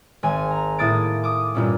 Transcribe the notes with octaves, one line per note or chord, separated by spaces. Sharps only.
G#1 G#5
A#5
A2 A#3 D#6 G#6 A6 D7
D6 D#6
G2 A#2 C#4